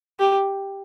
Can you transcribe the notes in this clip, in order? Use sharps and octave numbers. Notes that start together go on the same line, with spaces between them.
G4